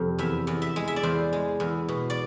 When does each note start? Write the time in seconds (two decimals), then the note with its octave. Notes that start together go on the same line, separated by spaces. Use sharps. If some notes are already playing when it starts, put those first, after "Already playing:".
Already playing: F2 C3
0.18 E2 E5
0.47 E2
0.62 E5
0.76 G#3
0.88 E5
0.96 D5
1.03 E2 C5
1.33 G#3
1.60 E2
1.88 B2
2.10 D5